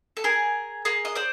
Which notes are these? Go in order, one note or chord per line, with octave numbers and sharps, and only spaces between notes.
A4
G#4 A#4
G#4 A#4
D#5
C5 D5